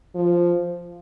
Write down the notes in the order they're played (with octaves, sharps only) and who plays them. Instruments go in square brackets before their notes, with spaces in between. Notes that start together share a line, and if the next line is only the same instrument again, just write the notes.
[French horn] F3